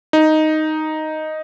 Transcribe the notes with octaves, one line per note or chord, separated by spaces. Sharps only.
D#4